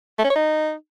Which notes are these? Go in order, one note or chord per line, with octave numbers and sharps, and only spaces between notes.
A3
C#4
C#5
D#4